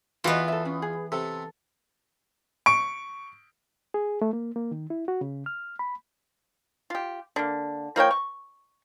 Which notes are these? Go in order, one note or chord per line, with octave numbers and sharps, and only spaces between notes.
E2 E3 B3 F4 F#4 D#5
A4 E5
C#4
G#4
C3 A4
C#6 D7
G#4
A3
A#3
A#3
D#3
E4
F#4
C#3
F6
B5
F4 G4
D3 A#3
F3 A#3 C#5 G5
C#6